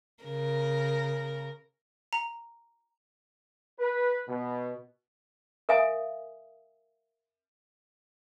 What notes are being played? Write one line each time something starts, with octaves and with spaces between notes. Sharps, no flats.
C#3 A#4
A#5
B4
B2
A#4 E5 F5 G#5 D#6